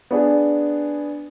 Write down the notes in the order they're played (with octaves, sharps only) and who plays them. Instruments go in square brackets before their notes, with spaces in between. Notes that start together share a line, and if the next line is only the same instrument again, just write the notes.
[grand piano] B3 D4 G#4